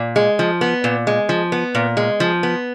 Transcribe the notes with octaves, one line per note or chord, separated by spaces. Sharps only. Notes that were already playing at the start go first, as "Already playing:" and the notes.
Already playing: A#2
G#3
F3
B3
A#2
G#3
F3
B3
A#2
G#3
F3
B3